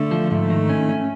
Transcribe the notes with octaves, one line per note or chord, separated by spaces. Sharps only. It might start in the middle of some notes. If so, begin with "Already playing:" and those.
Already playing: D3 A3
F3
G#2 A3
D#3
C#4
C#4